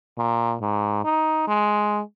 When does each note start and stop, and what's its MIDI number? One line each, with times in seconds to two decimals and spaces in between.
0.18 0.55 46
0.61 1.03 44
1.04 1.47 63
1.48 2.02 56